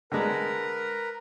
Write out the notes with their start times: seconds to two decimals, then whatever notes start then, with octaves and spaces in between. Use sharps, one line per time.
0.12 D3 G#3 A#4 B4 A#5